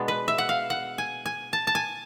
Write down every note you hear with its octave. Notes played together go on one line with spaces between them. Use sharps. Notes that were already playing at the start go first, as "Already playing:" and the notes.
Already playing: B2 G#3 B3 D4
B4
E5
F#5
F5
F#5
G#5
G#5
A5
A5
G#5